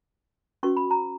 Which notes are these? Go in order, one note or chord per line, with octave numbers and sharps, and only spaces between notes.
C#4 F#4 B4 C#6
B5
A#5